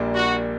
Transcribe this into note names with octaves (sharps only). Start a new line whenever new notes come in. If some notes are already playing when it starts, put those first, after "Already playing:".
Already playing: A#1 A#2 G3 A#3 D4
F#4